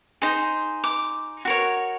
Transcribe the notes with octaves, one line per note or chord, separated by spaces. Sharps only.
D#4 G#4 C5
D6
F#4 A#4 C#5